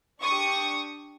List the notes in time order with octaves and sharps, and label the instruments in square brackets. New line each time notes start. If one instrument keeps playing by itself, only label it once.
[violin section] D4 G4 C#6 D#6